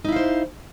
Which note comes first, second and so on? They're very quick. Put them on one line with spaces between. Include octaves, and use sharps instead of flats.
D#4 E4 F5 C5